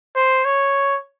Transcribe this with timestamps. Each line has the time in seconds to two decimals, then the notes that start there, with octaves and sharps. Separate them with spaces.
0.16 C5
0.45 C#5